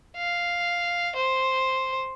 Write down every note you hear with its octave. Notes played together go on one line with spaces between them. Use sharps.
F5
C5